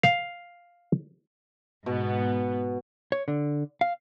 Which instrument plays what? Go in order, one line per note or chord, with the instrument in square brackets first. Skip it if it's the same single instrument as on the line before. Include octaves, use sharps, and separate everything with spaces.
[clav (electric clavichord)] F5
[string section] G#2 B3 [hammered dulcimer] B2
[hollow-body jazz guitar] C#5
D3
F5